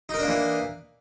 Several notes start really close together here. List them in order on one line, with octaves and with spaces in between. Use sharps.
D#4 A#4 D4 A#3 E3